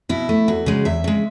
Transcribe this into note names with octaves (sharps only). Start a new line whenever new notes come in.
B2 E4
A3
E2 F#4
C#3 G#3
E2 E5
C#3 G#3